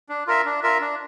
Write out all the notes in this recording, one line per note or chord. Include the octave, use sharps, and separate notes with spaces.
D4
F4 A#4 E5
D4
F4 A#4 E5
D4